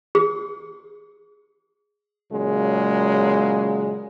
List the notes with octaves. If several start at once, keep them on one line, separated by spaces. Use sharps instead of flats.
G#4
A#2 C#3 F#3 G#3